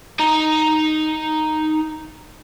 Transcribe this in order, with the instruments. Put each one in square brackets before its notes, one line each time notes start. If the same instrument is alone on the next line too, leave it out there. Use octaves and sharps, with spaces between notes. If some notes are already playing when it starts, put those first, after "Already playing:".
[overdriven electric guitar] D#4 A#5